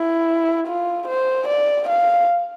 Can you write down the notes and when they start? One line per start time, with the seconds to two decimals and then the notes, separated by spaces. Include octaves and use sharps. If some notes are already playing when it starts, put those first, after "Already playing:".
Already playing: E4
0.67 F4
1.08 C5
1.48 D5
1.89 F5